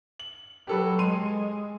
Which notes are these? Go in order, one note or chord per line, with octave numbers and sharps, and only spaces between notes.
F#7
F#3 G4 A4 B4
G#3 C6 D#7